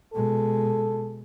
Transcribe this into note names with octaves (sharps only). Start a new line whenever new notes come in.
B2 G#3 A4